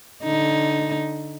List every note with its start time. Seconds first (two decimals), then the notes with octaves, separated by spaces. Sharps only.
0.24 D3 D#4